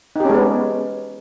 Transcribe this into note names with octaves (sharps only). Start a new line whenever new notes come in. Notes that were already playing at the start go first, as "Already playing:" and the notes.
G#3 B3 C#4 D#4 G4